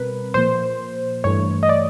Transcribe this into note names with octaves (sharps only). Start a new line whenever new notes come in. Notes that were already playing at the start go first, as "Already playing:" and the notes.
Already playing: B2 G3 C4 A#4 B4
A#2 F3 A#3 C5
G2 E3 A3 C#5
D#5
D5